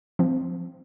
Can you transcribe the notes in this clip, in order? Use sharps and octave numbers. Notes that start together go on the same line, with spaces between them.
F3 C4